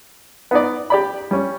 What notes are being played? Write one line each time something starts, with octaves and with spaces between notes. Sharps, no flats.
B3 D#4 D5
G4 D5 B5
G3 C#4